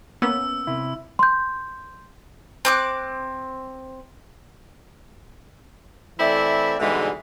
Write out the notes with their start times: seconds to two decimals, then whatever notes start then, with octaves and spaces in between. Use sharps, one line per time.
0.22 A#3 B3 C#4 E6
0.67 C3 E4
1.19 C6 G6
2.65 C4 D6 F#6
6.18 E3 A3 C4 E4 D5 E5
6.79 G#2 B2 D3 E3 G3 G#3